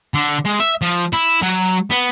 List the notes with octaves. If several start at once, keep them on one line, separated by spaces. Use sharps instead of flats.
D3
G#3
E5
F3
E4
F#3
B3